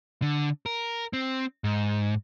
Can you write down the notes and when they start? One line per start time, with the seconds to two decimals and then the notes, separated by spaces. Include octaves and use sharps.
0.22 D3
0.66 A#4
1.13 C4
1.64 G#2